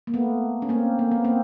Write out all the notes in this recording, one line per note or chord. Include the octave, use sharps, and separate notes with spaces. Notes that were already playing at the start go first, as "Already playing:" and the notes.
A#3
A3 B3
C#4
A#3 C4
A#3
B3
A#3 C4